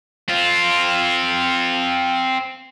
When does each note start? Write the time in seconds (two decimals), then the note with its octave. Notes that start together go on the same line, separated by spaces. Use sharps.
0.28 C4 F4